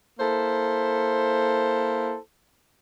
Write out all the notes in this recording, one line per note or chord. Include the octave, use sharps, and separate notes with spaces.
A#3 E4 A4 C5